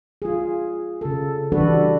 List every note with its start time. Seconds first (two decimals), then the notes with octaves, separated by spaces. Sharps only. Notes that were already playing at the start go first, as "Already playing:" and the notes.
0.22 F4 G#4
1.01 C#3 A4
1.52 E3 G3 D4 F#4 A4 B4